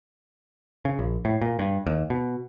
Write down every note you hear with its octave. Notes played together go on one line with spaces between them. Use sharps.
C#3
A#1
A2
A#2
G2
D#2
B2